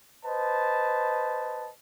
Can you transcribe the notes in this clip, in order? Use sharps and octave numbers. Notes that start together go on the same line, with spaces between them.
B4 C5 D#5 A5